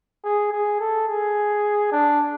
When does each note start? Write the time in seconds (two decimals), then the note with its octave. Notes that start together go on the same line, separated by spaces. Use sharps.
0.24 G#4
0.52 G#4
0.80 A4
1.08 G#4
1.92 D4